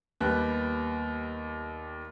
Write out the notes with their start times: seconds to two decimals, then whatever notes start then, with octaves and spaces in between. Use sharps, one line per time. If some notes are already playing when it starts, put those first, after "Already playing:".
0.21 D#2 G3 B3 F#6